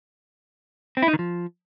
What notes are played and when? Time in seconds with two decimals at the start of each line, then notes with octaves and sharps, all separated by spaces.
0.97 C4
1.02 E4
1.08 D#4
1.13 D#3
1.19 F3